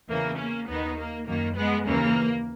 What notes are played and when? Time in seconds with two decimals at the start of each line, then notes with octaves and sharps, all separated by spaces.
0.09 E2 C#3 E3 A#3
0.38 A#3 C#4
0.68 D#2 D#3 B3 D#4
0.98 A#3
1.27 F#2 D#3 A#3
1.56 G#3 B3
1.85 D#2 C#3 E3 A#3